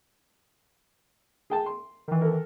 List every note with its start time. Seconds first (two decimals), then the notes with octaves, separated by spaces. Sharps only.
1.50 G#4 G5 A5
1.66 C6
2.08 D#3 E3
2.21 A4 A#4